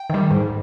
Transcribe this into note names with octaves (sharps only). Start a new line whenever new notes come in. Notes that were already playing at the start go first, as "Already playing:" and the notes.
Already playing: G5
D#3 G3
G#2